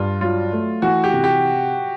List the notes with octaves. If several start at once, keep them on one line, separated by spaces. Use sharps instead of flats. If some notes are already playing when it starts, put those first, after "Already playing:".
Already playing: G2 F4
F#3 F4
A3
E3 F#4
G4
C3
G4